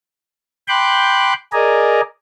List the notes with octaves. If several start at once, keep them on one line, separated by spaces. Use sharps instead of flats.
G5 B5 C6 D6 F#6 G6
G#4 A#4 D5 D#5 G#5 A#5